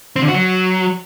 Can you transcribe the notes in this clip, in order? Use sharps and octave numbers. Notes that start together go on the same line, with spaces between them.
C4
D3
F#4
F#3